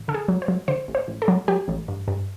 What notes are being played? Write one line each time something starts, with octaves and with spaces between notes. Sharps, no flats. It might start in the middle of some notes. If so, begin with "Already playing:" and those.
Already playing: A1
D3 A4
G#4
F#3
C5
F#3
D3 C5
A1
C5
A1
A4
F#3
F#3 G4
A1
G2
G2